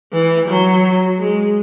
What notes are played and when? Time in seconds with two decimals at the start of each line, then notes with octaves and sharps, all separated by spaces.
0.12 E3
0.48 F#3
1.19 G#3